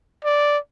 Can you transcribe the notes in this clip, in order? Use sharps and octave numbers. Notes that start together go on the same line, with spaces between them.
D5